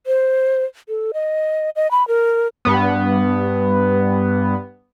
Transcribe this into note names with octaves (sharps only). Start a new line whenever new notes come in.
C5
A4
D#5
D#5
B5
A#4
G2 B3